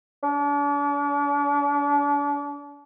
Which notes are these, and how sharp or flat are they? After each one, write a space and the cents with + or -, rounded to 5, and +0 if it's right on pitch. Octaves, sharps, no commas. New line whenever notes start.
D4 -40